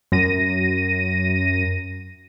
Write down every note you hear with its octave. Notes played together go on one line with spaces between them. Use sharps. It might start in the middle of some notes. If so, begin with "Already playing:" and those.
F#2 A#6 D#7